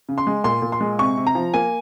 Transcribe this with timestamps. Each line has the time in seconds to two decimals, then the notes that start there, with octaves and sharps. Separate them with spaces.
0.09 C#3
0.18 C6
0.27 G#3
0.44 A#2 C6
0.62 A#2
0.72 C6
0.80 G#3
0.99 C3 C#6
1.17 C3
1.27 A#5
1.35 F3
1.54 A#3 G#5